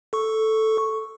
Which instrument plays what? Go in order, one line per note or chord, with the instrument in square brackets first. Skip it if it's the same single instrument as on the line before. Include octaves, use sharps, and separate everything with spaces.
[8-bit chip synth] A4 C#6